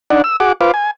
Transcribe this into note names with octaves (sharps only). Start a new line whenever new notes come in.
D4 D#4 D5 F#5
E6
F#4 G#4 F#5 D6
F4 B4 C5 F5 D6
G#5